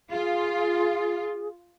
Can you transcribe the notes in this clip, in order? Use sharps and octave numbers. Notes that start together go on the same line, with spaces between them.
F4 G#4